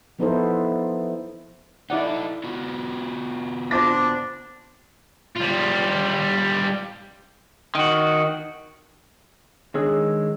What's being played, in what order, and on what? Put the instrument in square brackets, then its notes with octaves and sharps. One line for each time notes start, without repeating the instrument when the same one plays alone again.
[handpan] F3 B3 D#4 E4 A4 C5
[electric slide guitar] D#4 A4 [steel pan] E4 D5 F#5
[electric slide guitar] B3 F4 F#4
[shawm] D4 [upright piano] C5 D6 A#6
[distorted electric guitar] G3 F4
[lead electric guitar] D#3 F#4
[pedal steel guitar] D#3 G#3 E6 [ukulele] D4 G#4 C#5